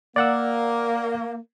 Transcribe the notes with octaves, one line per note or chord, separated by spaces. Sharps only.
A#3 D5 F#5 E6